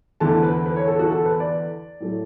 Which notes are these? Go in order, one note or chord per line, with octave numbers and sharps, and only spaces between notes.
E2 D3 A3 A5
B4
B4
C#5
A4
F#4
A4
B4
D5
A2 F#3 A3